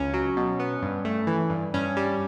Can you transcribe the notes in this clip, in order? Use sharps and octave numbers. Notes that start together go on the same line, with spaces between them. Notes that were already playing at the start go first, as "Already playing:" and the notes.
Already playing: C#2 C#4
F#3
B2
B3
G2
A3
E3
G2
G2 C#4
G3